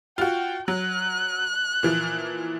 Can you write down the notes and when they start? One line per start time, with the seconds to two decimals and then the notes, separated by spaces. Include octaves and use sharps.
0.18 F4 F#4 G5
0.68 F#3 F#6
1.83 A#2 E3 F3